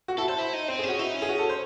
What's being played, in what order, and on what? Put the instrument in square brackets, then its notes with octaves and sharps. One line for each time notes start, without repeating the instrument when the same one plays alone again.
[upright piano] F#4
[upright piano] E4 [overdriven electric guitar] A4
[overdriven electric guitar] A4 [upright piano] C5
[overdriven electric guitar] E4
D#4
[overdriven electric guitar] C4 [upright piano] C5
[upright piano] G#4
[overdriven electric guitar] C#4
[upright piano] F#4
[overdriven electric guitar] D#4 [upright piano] E4
[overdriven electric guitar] C#4
[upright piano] G#4
F#4
A4
C5